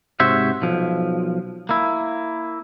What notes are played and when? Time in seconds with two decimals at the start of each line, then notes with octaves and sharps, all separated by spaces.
0.20 G#2 C3 F#4 C5 C#5 E5
0.62 B1 F3
1.69 A#3 E4